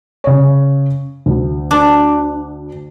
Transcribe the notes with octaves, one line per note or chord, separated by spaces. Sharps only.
C#3 C#5
D2
D4